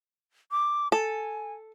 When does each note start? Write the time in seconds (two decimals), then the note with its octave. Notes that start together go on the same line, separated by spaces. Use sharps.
0.51 D6
0.92 A4 G#5